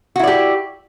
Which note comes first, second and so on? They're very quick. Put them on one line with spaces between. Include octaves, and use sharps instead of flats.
F#4 E4 D5 G4